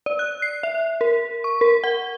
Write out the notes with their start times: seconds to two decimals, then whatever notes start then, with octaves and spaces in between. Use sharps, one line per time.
0.06 D5
0.19 F#6
0.42 C7
0.63 E5
1.01 A#4
1.44 C#6
1.61 A#4
1.84 F#5